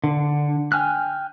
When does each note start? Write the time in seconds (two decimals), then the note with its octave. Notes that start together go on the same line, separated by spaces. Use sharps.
0.04 D3
0.72 G5 G#5 F6 F#6